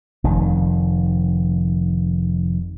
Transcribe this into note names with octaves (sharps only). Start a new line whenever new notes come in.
F1 F2 D#3